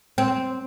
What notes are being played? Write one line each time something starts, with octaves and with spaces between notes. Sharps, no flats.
C4